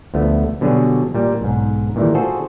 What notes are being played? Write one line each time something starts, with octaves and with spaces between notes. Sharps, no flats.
D2 F3 A3 B3
B2 D3 F#3 G3 D4 G#4
A#2 G3
B1 G#2
A#2 D#3 E3 G3 A3
F4 F#4 G#4 A4 C5